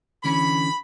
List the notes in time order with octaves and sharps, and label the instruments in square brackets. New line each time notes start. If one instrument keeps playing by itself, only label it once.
[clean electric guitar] D3 E3 C#4 [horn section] B5